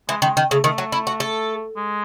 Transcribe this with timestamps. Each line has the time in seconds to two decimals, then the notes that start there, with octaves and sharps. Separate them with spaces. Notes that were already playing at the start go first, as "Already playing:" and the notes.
0.09 E3 G#3
0.22 D#3 G#3
0.37 D#3
0.50 C#3 A3
0.64 D#3 A3
0.78 F#3
0.92 E4
1.07 F#4
1.20 A4
1.77 G#3